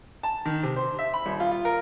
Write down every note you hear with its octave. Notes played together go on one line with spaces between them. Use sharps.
A5
D#3
C3
C5
E5
B5
D#1
F4
F4
A#4